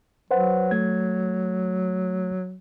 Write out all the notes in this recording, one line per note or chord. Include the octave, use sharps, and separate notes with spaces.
F#3 B4 C5 F#5
A3 G#6